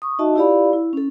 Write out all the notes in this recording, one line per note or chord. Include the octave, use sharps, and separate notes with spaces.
C#6 D#6
D#4 F#4 D#5 E5 A5
E4 F4 G4 D5 F5 B5
E4
C#4 A4